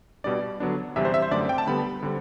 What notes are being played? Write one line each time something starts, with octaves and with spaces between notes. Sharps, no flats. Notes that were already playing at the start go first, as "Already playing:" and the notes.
B2 G3 D4 D5
D3 F#3 B3 D4
E2 C3 G3 E5
C5
E5
C5
F#2 D3 A3 C4 D5
G5
A5
D3 G3 B3 B5
D3 G3 C4